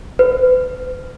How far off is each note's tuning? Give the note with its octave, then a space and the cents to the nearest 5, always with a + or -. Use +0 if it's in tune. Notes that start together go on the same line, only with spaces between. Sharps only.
B4 +40